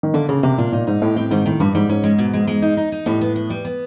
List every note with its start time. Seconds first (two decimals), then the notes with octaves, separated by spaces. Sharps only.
0.03 D#3
0.14 D3 A#3
0.29 C#3 A#3
0.43 C3 A#3
0.58 A#2 D4
0.72 A#2 D#4
0.87 G#2 D#4
1.02 A2 G4
1.16 A2 C4
1.31 G#2 D#3
1.45 A2 D#3
1.60 G2 G3
1.75 G#2 G3
1.89 G#2 C#4
2.04 G#3
2.19 B2
2.34 G#3
2.47 G#3
2.62 D#4
2.77 D#4
2.92 D#4
3.06 A2 G3
3.21 B3
3.36 B3
3.50 G3
3.65 B3